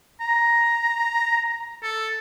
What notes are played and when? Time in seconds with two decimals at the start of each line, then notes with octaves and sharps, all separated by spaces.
0.20 A#5
1.83 A4